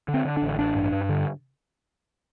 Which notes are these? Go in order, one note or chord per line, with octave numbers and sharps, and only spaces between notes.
D3
C4
D3
D4
A1
A1 D4
G2
G2
D3